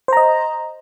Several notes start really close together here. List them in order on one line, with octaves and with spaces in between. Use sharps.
C5 A#5 D#5